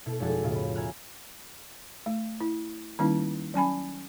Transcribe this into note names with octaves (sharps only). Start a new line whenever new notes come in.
B2 E4 A4
F1 G#3 E4 F#4 A4 A6
C#2 A2 B3 F4 D#5 D#6
B5
E5 G#5 A#5 B5 F6 F#6
A3
E4
D#3 G3 A#3 C#4 D#4 E4
F#3 C#4 G#5 B5